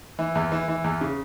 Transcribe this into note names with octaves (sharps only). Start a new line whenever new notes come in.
E3
E2
E3
E3
E2
C#3